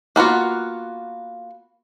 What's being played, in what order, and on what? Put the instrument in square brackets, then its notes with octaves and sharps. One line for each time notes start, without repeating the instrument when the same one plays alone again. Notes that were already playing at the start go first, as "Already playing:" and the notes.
[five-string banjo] A#3 B3 F4 F#4